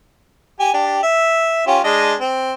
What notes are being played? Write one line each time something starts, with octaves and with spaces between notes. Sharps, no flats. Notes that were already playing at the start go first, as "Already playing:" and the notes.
G4 G#5
D4 G4
E5
C#4 F4 G4
G#3 D4 D#5
C4